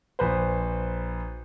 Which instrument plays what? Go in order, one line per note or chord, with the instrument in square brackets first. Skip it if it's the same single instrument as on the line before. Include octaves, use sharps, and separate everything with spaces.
[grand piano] A#1 B4 C5